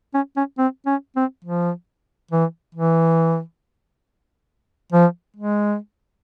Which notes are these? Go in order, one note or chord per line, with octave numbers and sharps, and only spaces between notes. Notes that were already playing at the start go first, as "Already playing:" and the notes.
C#4
C#4
C4
C#4
C4
F3
E3
E3
F3
G#3